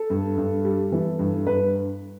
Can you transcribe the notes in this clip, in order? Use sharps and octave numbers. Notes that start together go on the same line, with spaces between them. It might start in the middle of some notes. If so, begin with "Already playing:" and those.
Already playing: A4
G2
G2
G3
E3
G2
G2 B4